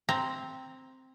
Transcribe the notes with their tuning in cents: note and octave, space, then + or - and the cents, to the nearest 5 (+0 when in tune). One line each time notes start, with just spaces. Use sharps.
C4 +0 A#5 +0